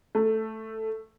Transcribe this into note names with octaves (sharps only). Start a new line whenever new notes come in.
A3